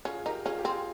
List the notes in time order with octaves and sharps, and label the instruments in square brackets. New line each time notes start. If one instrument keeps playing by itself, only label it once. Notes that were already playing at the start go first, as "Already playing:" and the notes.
[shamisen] C#4 [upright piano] F4 G#4
[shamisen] D#4 [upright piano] G4 A#4
[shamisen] C#4 [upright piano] F4 G#4
[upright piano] G4
[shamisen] C4 [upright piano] F4 G#4